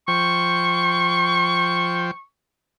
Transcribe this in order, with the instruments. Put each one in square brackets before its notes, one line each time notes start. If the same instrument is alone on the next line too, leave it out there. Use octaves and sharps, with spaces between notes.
[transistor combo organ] F3 C5 G5 [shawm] C#6